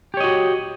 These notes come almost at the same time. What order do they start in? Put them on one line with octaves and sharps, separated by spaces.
G4 C#5 D#5 F#4